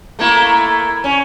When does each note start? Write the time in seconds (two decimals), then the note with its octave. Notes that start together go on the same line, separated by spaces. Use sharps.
0.19 A3 A#3 E4
1.04 C#4